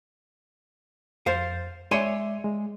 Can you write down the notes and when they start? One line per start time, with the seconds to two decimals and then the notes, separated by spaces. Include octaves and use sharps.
1.26 F2 C5 F5 A6
1.91 G#3 C#5 D5 E5 G#5 C6
2.44 G#3